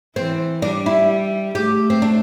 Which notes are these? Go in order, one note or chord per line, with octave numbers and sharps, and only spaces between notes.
E3 C4
G3 D4
E4
A3 G4
C4
D4